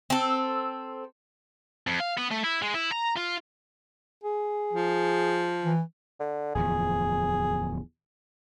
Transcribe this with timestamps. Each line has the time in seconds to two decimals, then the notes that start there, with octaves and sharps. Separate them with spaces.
0.10 C4 A4
1.87 F2
2.00 F5
2.18 B3
2.31 A3
2.44 E4
2.62 G#3
2.75 E4
2.92 A#5
3.17 F4
4.24 G#4
4.73 F3
5.65 E3
6.20 D3
6.55 D1 E2 F3 G#4